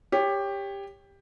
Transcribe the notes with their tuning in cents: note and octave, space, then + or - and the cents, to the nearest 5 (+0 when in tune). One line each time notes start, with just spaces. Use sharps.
G4 +15 C#5 +0